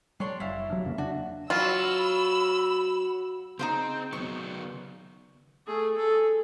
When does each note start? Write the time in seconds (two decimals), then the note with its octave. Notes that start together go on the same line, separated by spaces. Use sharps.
0.20 G3 D4 C#5 C6
0.40 F#1 E4 F5
0.70 G2 F#3
0.84 E2 C#3 A#3
0.98 D4 F#4
1.50 F#3 F4 B5 E6
3.59 C#3 C4 D#4 F4 C5
4.13 D#3 F#3 B3 C#6
5.66 A3 G#4
5.97 G#4 A4